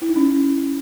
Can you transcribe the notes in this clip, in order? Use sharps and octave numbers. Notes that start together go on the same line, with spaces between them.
E4
D#4
C#4